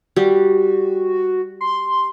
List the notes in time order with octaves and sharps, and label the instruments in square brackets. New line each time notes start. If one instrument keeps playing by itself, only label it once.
[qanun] G3 [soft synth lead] F#4
[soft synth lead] C6